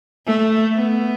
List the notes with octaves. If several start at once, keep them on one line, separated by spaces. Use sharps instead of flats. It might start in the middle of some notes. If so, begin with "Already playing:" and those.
A3
B3